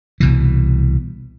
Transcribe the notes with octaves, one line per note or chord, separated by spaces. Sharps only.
C2 B2 E3